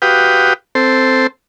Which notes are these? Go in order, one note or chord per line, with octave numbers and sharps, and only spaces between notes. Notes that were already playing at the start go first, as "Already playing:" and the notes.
F#4 G4 B4 F5 G5 D#6
C4 A4 C5